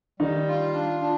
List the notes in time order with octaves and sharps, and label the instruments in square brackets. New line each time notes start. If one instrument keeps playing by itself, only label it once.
[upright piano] D#3 D#4 [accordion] G3
[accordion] F4
D4
D4